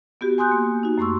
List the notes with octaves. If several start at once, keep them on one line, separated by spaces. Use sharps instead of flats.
B3 F#4 G4
G#5 C6 D#6 F#6 G6
A#3
D#4 F#4
F#2 A3 C6 C#6 E6